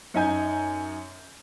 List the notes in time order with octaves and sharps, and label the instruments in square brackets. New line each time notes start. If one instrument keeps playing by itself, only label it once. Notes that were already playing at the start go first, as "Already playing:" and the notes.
[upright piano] F#2 D#4 G#5 G6